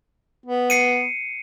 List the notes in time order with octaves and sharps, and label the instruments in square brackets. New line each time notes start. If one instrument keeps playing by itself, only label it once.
[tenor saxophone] B3
[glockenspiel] C7 C#7 D#7